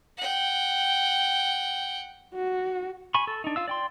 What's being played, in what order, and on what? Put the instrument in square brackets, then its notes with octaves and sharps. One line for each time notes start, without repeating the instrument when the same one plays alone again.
[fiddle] F#5 G5
[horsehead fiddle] F#4
[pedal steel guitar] G#5 B5 C#6
A4
D4 D#4
F4 F5 E6
D5 G5 C6